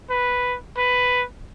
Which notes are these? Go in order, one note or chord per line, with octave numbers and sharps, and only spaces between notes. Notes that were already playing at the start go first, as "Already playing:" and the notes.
B4
B4